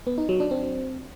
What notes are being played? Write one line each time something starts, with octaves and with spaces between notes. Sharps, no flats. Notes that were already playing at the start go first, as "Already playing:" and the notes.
B3
D#4
F#3
D4
C4